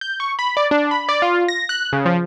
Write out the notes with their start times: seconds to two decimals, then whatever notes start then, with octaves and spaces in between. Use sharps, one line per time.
0.01 G6
0.20 C#6
0.39 B5
0.57 D5
0.71 D4
0.91 B5
1.09 D5
1.22 F4
1.48 A#6
1.69 F#6
1.93 C#3
2.05 F3